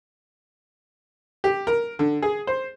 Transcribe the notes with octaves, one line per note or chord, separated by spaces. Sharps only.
G4
A#4
D3
G#4
C5